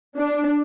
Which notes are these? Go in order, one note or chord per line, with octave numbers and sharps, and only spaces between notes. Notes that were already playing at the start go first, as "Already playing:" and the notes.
D4